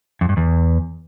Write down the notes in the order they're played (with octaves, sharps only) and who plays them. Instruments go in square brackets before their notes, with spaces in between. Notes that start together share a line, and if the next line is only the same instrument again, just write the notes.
[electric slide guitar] F2
G2
E2